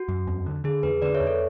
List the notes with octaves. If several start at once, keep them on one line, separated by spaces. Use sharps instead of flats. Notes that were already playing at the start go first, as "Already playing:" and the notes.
Already playing: F#4
F#2
E2
D3
D3 G#4
E2 G#4 B4
D3 B4 D5
C#5 E5
E2
A4 C#5